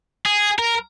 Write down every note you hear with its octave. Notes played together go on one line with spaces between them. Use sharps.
G#4
A#4